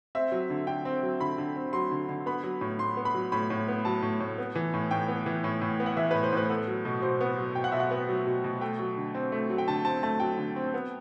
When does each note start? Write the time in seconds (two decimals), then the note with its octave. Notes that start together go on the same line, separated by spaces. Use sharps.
0.15 C4 E5
0.32 F#3
0.50 D3
0.67 D3 G5
0.85 C4
1.03 F#3
1.20 D3 B5
1.38 D3
1.56 C4
1.73 F#3 C6
1.91 D3
2.09 D3
2.26 B3 B5
2.44 F#3
2.61 A2
2.79 A2 C6
2.97 B3
3.05 B5
3.14 F#3
3.32 A2 B5
3.50 A2
3.68 B3
3.85 F#3 A5
4.02 A2
4.20 A2
4.38 B3
4.55 E3
4.74 A2
4.91 A2 G5
5.08 B3
5.26 E3
5.44 A2
5.62 A2
5.80 B3
5.86 F#5
5.97 E3 E5
6.11 A2 B4
6.24 C5
6.32 A2 B4
6.50 B3 A4
6.68 F#3
6.85 B2
7.02 B2 C5
7.21 B3
7.38 F#3
7.55 B2 G5
7.64 F#5
7.72 B2 E5
7.80 F#5
7.91 B3
8.09 F#3
8.27 B2
8.44 B2
8.61 A3 G5
8.79 F#3
8.97 D3
9.15 C4
9.32 A3
9.50 F#3
9.58 G5
9.68 D3 A5
9.85 C4 A5
10.03 A3 A5
10.20 F#3 G5
10.38 D3
10.56 C4
10.74 B3